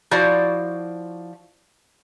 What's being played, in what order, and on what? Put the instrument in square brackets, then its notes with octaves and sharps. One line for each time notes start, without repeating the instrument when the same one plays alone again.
[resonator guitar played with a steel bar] F3 E4 F#4 C5 D5